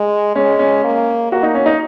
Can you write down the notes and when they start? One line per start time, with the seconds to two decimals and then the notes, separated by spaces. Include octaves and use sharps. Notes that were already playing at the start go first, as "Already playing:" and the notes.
Already playing: G#3
0.36 G#3 C#4
0.59 C#4
0.84 A#3
1.31 A#3 F#4
1.43 D#4
1.55 C#4
1.66 D#4